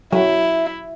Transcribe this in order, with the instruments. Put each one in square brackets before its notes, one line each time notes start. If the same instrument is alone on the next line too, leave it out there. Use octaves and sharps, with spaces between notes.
[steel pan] F#3 [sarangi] E4